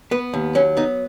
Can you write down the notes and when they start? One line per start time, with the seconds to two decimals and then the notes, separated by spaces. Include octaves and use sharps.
0.11 B3 B4
0.34 D#2
0.55 F#3 C#4
0.77 B3 D#4